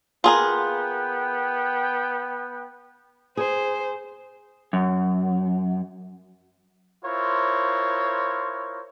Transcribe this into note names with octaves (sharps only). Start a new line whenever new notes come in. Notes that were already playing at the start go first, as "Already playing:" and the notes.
B3 F4 G#4 A#4 G5
G#4 C5
F#2
E4 F4 A#4 C5 C#5